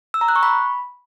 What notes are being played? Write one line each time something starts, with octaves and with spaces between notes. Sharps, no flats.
E6
A#5
F#6
C#6
B5